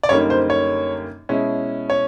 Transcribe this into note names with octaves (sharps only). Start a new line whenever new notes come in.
D5
F#2 D3 G3 A#3 D#4 C#5
C5
C#5
B2 G#3 C#4 E4
C#5